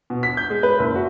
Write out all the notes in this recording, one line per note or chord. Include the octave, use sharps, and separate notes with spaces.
B2
B6
G6
G#3
B4
F#1
F#4